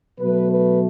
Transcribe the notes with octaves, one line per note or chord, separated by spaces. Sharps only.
B2 F#3 A3 B4
B4